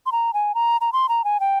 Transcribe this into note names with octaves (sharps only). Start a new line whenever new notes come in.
C6
A#5
G#5
A#5
A#5
C6
A#5
G#5
G5